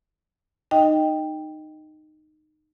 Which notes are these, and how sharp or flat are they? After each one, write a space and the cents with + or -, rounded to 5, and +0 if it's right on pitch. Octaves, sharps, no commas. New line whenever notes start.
D#4 -15 D#5 +0 G5 +5